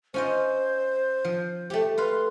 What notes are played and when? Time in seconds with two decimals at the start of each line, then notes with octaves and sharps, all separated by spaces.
0.14 C#4 F4 C5 D#5
1.25 F3
1.70 A3 G4
1.98 B4 F5 C6